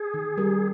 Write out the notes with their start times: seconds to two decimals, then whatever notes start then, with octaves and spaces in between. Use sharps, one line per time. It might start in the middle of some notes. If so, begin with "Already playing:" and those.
Already playing: G#4
0.14 D#3
0.37 G3 C#4 G4 A#4